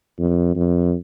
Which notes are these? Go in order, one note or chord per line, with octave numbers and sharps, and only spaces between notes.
F2
F2